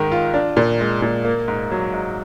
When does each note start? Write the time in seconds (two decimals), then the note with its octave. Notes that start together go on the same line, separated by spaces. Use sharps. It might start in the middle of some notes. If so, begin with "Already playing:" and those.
Already playing: G#2 D#3
0.12 F4
0.34 D4
0.57 A#2
0.80 G#3
1.02 A#2
1.25 A#3
1.48 G#2
1.71 F#3
1.94 G#2